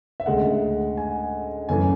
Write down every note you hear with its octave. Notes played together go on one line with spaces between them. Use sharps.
E5
D2 C#3 G#3 F#5
G#5
F#2 C#3 E3 A3 G#5